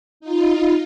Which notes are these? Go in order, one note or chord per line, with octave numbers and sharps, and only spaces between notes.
D#4 F4